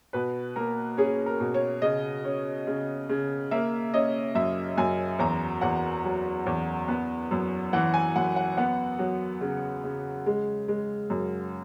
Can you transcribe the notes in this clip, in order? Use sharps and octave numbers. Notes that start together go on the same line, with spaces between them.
B2 B4
A#3 A#4
C#4 G#4
A#4
B2
C#5
C#3 D#5
C#4
C#3
C#3
A#3 E5
C#4 D#5
F#2 E5
F#2 G#5
E2 A#5
E2 F#5
F#3
E2
B3
F#2
E3 F#5
G#5
F#2 F#5
F#5
B3 F#5
F#3
C#3
C#3
G#3
G#3
F#2